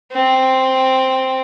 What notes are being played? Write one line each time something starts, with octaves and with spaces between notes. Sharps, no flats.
C4